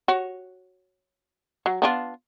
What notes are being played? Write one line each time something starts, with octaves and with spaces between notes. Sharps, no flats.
F#4 C#5
F#3
B3 D4 F4